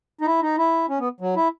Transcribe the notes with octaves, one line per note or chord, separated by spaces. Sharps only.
D#4
E4
D#4
E4
C#4
B3
F#3
E4